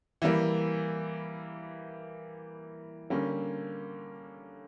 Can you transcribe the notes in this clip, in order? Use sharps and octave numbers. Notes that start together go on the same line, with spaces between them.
E3 G3 A#3
D3 G3 A#3 C#4